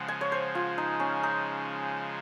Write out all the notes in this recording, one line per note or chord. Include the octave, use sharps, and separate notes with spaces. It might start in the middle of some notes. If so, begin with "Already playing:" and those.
Already playing: C#3 F3 G#3 F#5
G#5
C#5
C5
F4
D#4
C#4
D#4